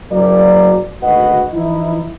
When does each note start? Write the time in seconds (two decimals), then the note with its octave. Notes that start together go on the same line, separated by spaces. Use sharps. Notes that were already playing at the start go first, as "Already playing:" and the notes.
0.11 F#1 F#3 A#3 A#4 D5
1.02 G#1 D2 F#4 B4 D#5 F#5
1.53 E3 F3 D#4 E4